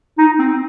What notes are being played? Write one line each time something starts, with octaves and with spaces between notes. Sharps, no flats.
D#4
C4